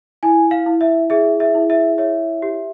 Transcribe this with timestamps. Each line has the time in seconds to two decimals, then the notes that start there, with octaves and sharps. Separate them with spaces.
0.23 E4 G#5
0.51 F5
0.66 E4
0.81 E5
1.10 G#4 E5
1.40 E5
1.55 E4
1.70 E5
1.98 C#5 E5
2.42 G4